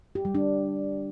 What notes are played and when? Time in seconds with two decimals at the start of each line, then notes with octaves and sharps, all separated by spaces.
0.15 G4
0.25 G3
0.35 D4